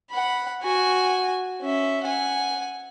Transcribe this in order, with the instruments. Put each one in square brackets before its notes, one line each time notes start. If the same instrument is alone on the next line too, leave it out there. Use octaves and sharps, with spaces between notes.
[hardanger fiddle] F#5 B5
F#4 G#5
C#4 E5
F#5 G#5